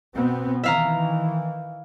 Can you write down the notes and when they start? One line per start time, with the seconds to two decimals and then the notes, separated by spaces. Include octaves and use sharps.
0.14 B2 B3 C4
0.64 D#3 E3 E5 F5 A#5